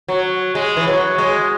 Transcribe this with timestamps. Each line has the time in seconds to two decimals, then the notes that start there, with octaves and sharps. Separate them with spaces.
0.08 F#3
0.55 G#3
0.77 E3
0.88 F#3
1.18 G#3